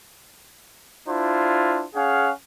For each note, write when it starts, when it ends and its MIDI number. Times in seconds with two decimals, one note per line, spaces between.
1.08 1.85 62
1.08 1.85 64
1.08 1.85 65
1.08 1.85 72
1.95 2.31 61
1.95 2.31 68
1.95 2.31 77
1.95 2.31 78